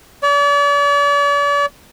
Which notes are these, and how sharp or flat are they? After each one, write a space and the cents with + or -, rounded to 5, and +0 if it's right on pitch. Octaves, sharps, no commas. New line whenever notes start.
D5 -45